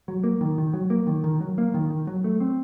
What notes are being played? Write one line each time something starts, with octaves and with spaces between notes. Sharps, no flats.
F#3
A#3
D#3
D#3
F#3
A#3
D#3
D#3
F#3
A#3
D#3
D#3
F#3
A3
C4